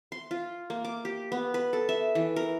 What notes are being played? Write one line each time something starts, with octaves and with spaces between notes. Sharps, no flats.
C6
F4
A#3
D6
G4
B3
B4
A4
E5
E3
A#4